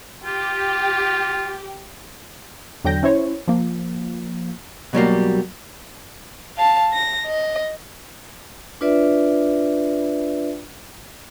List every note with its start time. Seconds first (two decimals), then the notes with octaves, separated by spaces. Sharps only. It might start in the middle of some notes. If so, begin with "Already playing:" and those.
0.24 F4 G4
2.84 E2 D3 F#3 G5 G6 A#6
3.03 C#4 E4 C5 C#5
3.48 F3 A#3
4.93 B2 F#3 G3 A#3
6.57 F5 A5
6.93 A#6
7.27 D#5
8.81 D4 F4 B4 D5 E5